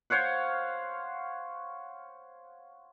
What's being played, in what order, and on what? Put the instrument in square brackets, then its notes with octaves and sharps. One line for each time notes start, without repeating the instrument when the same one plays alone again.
[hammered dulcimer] C5 C#5 F5 F#5